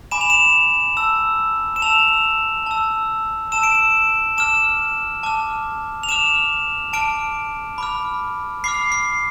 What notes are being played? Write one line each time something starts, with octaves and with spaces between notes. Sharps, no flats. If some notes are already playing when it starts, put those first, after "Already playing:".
G#5 B5 D6 E7
F7
E7
A5 E6
E7
A5 E6 F7
A5 E6
A5 E6 E7
D7
E7
A5 D6 F6 E7
A5 D6 F6
F7
A5 D6 F6 E7
A5 D6 F6 D7
B5 D6 F6
B5 D6 F6 C7
C7